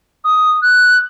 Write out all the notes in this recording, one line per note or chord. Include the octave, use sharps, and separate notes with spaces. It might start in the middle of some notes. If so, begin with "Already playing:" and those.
D#6
F#6